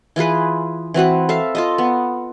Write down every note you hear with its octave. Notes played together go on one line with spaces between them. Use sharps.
E3 F4 G#4 B4
E3 C4 F#4 B4
A4 E5 F5
F4 A4 D#5
B3